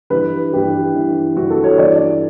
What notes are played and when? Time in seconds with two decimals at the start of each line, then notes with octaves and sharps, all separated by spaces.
0.10 G2 E3 B4
0.52 G2 E3 G4
0.95 G2 E3
1.36 G2 E3 F#4
1.50 A4
1.64 C#5
1.78 G2 E3 D5